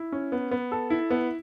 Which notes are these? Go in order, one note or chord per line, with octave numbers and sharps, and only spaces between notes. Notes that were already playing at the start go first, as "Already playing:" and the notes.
Already playing: E4
C#4
B3
B3
A4
E4
B3